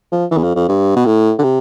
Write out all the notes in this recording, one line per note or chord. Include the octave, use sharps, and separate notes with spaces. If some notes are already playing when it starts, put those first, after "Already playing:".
F3
E3
E2
F2
F2
G2
B2
A2
D3
C3